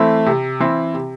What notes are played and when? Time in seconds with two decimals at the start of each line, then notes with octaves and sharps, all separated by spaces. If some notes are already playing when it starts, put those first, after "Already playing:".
Already playing: E3 A3 C4 E4
0.26 C3
0.60 E3 C4 E4
0.94 C3